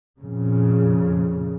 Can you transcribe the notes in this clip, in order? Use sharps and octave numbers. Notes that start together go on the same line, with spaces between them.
F2 A#2 C#3